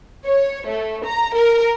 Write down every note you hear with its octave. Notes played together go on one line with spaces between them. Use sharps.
C#5
A3
A#5
A#4